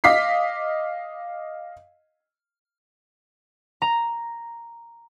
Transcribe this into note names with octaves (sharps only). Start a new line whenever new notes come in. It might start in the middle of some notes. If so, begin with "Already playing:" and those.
D#5 F5 D6 B6 C7
A#5